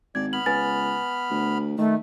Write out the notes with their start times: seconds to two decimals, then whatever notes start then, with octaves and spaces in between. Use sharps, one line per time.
0.15 G#1 D5 G#6
0.33 B3 B5 F6 F#7
0.46 C#2 B4 G#5 A6
1.30 D2
1.78 D#3 A3